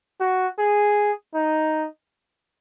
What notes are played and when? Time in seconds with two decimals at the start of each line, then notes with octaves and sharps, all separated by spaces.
0.21 F#4
0.59 G#4
1.34 D#4